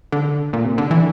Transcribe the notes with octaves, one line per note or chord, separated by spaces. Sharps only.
D3
A#2
C3
D3
E3